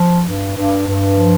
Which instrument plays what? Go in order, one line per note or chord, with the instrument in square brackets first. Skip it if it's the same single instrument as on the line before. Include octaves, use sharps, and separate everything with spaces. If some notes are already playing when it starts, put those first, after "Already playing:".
Already playing: [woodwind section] F3
G2
G2
G2
F3